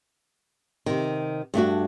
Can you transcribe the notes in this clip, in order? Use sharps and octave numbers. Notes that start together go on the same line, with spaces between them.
C3 D#3
G2 A3 D4 F#4